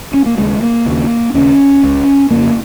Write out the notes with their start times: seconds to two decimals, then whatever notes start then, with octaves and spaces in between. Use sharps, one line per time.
0.14 C#4
0.26 A#3
0.37 D#2 C#3 G#3
0.62 A#3
0.86 D#2 C#3
1.34 D#2 C#3 C#4
1.83 C#2 C#3
2.31 F2 C#3 A#3